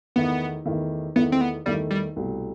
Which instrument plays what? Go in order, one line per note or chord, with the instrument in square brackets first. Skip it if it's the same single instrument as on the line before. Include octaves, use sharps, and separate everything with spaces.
[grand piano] E2 D#3 A3 E4 [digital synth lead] B3
[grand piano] E2 D#3 A3 E4
[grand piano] E2 D#3 A3 E4 [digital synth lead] B3
[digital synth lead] C4
B3
[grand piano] E2 D#3 A3 E4 [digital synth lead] G3
[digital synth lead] G3
[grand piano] C2 B2 A3